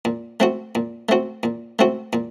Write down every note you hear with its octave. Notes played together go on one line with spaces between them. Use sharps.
A#2
A3 C4 F#4
A#2
A3 C4 F#4
A#2
A3 C4 F#4
A#2